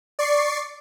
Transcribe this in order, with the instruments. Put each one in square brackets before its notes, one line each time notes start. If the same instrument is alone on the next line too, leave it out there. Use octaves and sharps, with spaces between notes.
[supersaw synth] D5 C#6 C7